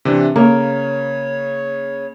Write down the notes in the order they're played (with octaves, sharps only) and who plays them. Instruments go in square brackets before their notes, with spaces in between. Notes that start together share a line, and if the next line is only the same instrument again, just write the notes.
[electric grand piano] C3 E3 D4
[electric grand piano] C#3 [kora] A#3 [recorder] C#5